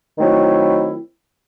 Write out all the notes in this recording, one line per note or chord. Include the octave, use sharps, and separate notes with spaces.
D#3 F#3 A3 C4 E4